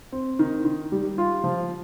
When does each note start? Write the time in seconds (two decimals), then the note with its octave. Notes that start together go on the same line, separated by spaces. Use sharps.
0.12 C4
0.39 D#3
0.65 D#3
0.92 G3
1.18 F4
1.44 F3